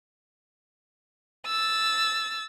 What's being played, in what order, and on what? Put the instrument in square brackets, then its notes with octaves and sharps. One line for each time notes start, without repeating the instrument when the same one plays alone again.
[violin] E6 A6